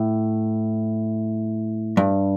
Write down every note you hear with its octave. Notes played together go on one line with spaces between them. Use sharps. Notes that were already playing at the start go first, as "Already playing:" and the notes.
Already playing: A2
G2